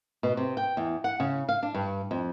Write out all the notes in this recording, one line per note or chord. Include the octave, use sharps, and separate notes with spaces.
B2
C3
G5
E2
F#5
C#3
F5
D4
G2
F2